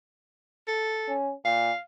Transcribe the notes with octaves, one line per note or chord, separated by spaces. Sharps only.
A4
C#4
A#2 F5